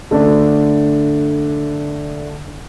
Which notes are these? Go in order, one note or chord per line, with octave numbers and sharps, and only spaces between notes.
D3 A3 D4